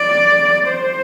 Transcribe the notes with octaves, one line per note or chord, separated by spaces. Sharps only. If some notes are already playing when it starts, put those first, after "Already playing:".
Already playing: D5
C5